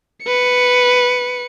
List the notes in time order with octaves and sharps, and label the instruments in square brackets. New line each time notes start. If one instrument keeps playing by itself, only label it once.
[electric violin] B4 C#7